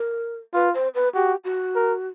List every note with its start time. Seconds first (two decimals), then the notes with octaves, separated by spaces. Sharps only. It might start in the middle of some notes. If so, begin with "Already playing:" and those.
Already playing: A#4
0.54 F4 B4
0.74 C5
0.94 B4
1.15 F#4 G4
1.44 F#4
1.75 A#4